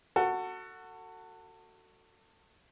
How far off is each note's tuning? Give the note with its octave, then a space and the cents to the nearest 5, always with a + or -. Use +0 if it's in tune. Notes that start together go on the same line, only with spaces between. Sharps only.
F#4 +0 A4 +30